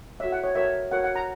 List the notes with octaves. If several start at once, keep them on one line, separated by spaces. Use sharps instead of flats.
F#4 C#5 E5
F#5
C#5
F#4 A#4 C#5 E5
F#4 A#4 C#5 F#5
F#5
A#5